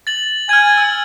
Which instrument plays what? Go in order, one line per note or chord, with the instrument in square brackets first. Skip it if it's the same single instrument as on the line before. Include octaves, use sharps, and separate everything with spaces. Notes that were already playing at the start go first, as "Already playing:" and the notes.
[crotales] A6 F#7
[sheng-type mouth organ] G#5 [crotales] F6 G#6
[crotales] E6